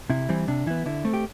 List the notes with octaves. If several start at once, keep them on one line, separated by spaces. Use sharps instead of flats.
C3 E4
E3 G3 C4
C3 D4
E3 B3 E4
D3 E4
A3 C4
G4